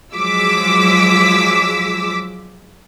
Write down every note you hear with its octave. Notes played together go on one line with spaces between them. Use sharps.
F3 F#3 G#3 D6 E6 B6